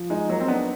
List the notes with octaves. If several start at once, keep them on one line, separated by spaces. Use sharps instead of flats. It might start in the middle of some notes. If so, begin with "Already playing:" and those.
Already playing: F3
G#3 D#4
F#3 A#3
C4
B3 D4